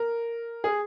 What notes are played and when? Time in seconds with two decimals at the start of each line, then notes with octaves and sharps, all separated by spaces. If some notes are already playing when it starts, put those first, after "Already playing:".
Already playing: A#4
0.64 G#4